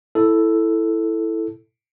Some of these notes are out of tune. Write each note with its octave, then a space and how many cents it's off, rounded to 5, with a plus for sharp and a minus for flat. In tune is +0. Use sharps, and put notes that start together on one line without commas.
E4 +0 A4 +0